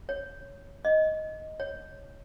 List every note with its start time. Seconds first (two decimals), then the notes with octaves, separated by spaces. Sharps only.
0.09 C#5
0.85 D#5
1.60 C#5